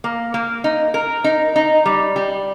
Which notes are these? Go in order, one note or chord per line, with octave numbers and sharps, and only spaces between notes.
A#3
A#3
D#4
A#4
D#4
D#4
G3
G3